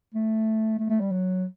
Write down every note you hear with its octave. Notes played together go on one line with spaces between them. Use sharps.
A3
A3
A3
G3
F#3